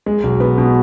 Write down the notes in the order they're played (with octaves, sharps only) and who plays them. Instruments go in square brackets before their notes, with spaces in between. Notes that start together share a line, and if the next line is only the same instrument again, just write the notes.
[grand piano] G#3
B1
B3
B2